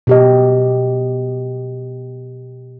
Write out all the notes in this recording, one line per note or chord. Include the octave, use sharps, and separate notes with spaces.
B2 G4 D#5